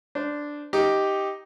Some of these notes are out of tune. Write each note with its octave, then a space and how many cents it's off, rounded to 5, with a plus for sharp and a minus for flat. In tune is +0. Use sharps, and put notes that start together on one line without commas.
D4 +0 C5 -25
D#4 +5 G4 +0